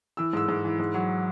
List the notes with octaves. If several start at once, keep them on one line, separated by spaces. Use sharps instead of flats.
E3 E6
G#2 E6
G#2
E3
G#2
F#3